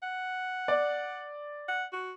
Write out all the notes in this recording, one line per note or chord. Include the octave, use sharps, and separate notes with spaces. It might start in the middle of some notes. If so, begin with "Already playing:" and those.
F#5
D5
F#5
F#4